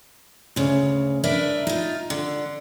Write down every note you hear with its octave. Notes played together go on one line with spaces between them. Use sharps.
D2 C#3
D4 A#4 B4 D5 E5
D#4 F4
D3